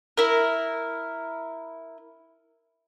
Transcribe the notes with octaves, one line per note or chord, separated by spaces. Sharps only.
E4 A#4